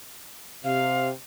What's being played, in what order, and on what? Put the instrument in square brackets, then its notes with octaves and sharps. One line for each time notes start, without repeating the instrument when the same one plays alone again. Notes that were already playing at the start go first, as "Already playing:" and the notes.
[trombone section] C3 [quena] F5